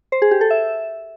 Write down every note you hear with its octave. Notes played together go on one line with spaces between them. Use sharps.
C5
G#4
G4
A4
E5